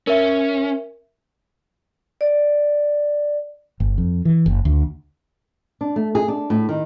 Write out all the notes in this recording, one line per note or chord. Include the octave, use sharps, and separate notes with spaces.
C#4 A#4 E5
D5
G1
F2
E3
F#1
D2
D4
A3
G#4
D4
A2
D#3